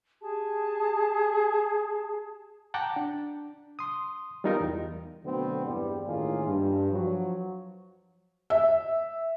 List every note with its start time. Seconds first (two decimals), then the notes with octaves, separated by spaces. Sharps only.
0.20 G4 G#4 A5
2.74 F#5 G5 A5 A#5 D6
2.96 D4
3.79 C6 D#6
4.44 G3 B3 D#4 F4 A#4
4.60 E2
5.25 B2 D3 F#3 A3 B3 C4
5.65 E2 G2 G3
6.06 A1 A2 D#3 A#3 F4 G#4
6.47 G2
6.92 F3 F#3
8.50 E5